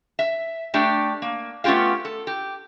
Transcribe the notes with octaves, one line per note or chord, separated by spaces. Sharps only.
E5
A3 D4 G4 D5
A#3
A3 B3 C#4 F4 G4 F5
A4
G4